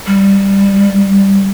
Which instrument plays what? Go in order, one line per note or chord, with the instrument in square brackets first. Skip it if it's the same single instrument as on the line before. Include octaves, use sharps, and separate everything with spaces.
[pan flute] G3